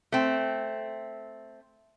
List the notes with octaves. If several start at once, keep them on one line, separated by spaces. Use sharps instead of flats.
A3 C4